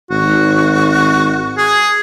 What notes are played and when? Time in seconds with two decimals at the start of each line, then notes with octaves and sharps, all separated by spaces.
0.11 G#1 F#4
1.58 G#4